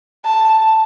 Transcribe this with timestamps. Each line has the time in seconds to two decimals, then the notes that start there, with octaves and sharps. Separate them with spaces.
0.25 A5